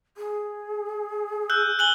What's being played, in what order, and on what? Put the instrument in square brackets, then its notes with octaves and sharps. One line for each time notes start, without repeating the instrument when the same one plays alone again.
[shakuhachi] G#4
[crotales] E6 F#6 G6
[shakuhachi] G#5 [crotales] F#6 F#7 G7